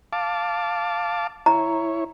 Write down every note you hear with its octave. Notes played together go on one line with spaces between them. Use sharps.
F5 A5 D6
E4 C#5 A#5